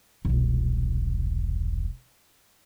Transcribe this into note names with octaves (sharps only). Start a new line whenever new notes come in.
E1 C2